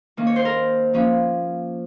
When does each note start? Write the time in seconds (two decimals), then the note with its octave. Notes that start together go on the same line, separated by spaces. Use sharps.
0.17 D#3 A#3 C#4
0.27 C#5
0.36 C5
0.45 A#4
0.93 F3 A#3 C#4